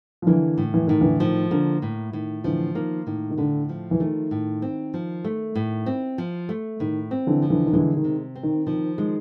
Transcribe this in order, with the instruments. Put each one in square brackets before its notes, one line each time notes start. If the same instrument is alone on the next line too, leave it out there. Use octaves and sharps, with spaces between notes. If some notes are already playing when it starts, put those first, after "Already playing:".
[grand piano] F3
[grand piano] D3 E3 [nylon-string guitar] A#3
[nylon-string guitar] A2
[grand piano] E3
[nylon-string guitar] A2 [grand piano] D#3
[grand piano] D3 E3
[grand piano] D#3 [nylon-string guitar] F3
[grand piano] D3 [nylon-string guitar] A#3
[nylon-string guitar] A2
[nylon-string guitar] A2 [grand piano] D#3
[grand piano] D3 E3 [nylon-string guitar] F3
[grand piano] D#3 [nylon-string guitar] A#3
[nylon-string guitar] A2 [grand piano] D#3
[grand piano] D#3
[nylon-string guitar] A2 [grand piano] D3
[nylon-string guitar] F3
[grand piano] E3
[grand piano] D#3 [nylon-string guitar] A3
[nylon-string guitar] A2
C4
F3
A3
A2
C4
F3
A3
[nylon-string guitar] A2 [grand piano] D#3
[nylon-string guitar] C4
[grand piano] D3 E3
[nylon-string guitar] F3
[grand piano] D3 E3
D#3
[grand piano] D3 E3 [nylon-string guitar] G#3
[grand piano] D#3
[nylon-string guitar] C3
C4
[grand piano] D#3
[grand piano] D#3 [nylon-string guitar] F3
[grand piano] D#3 [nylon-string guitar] G#3